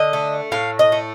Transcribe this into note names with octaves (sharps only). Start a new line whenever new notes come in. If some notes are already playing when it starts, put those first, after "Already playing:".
Already playing: D3 D#5
A3
A2 F5
D#5
A3